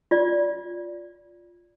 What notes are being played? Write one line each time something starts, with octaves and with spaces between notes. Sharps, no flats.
F4 D5